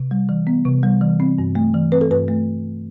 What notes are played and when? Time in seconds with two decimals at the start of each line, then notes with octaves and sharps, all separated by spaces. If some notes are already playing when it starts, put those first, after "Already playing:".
Already playing: C3
0.11 G3
0.29 E3
0.47 B3
0.65 C3
0.83 G3
1.01 E3
1.20 C4
1.38 G2
1.55 A3
1.74 E3
1.92 C4 B4
2.01 A4
2.11 G2 B4
2.28 A3